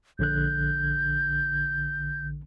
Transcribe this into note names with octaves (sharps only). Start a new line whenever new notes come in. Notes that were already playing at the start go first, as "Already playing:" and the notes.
A#1 D3 F#6 G6